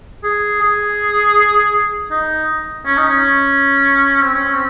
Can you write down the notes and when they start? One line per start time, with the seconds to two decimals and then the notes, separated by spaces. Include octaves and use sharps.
0.23 G#4
0.61 G#4
2.11 D#4
2.86 C#4
2.97 D#4
3.09 C#4
4.22 C4
4.34 C#4
4.54 C4